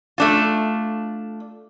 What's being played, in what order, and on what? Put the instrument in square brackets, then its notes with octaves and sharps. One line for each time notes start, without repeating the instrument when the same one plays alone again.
[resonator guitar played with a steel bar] A3 D4 F4